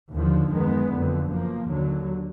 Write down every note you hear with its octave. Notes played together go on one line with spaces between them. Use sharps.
D#2 D3 F3
F#2 D#3 G#3 B3
F#1 F2 D3
F#2 F3 A#3
D#2 D3 F#3